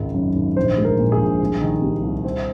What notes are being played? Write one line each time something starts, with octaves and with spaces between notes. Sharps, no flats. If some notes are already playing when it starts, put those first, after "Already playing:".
Already playing: G#1 C#2 D#3
F#2
G#1
A#1 C5
G#3
A#4
A#2
G#4
A#1
C2
D#3
C3
C2
C4